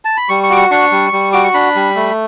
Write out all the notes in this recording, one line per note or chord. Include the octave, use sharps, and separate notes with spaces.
A5
B5
G3 C#6
C#6
F#4 D6
C#6
D4 C#6
G3
G3
F#4 D6
C#6
D4 B5
G3
A3